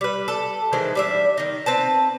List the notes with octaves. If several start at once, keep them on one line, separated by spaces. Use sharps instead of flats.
G3 B4
A4
D#3 E3 G#3 C5
G3 D4 E5
D#3 D#4
C4 B4 A5